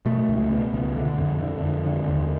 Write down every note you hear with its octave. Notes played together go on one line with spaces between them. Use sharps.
B2 A3
C#2
B2
C#2
D3
F2
D3
F2
D3
D#2